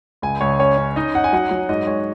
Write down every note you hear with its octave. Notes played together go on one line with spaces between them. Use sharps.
C#2 G#5
C#2 C#5
C#4 C#5
C#4
D#4 D#5
D#4 F#5
G#5
F#3 F#5
F#3
G#2 D#5
G#3 C#5